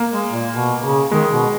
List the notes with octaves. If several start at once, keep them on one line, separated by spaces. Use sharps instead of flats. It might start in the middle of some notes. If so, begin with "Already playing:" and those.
Already playing: A#3
G#3
A#2
B2
C#3
D#3 G#3
B2